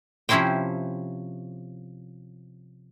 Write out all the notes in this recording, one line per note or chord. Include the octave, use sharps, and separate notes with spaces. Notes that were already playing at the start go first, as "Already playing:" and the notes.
C3 F3 C#4 E4 C5 G5